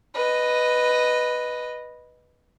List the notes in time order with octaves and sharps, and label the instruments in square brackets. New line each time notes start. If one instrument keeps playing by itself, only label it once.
[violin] B4 D#5